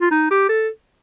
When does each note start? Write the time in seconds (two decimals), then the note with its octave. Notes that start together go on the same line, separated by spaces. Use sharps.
0.01 F4
0.11 D#4
0.31 G4
0.49 A4